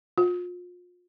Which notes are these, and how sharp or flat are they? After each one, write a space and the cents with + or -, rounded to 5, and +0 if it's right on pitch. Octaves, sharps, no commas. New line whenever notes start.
F4 +35